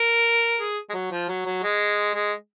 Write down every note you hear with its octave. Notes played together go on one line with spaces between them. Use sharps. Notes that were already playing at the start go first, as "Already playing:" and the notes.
Already playing: A#4
G#4
G#3
F#3
F3
F#3
F#3
G#3
G#3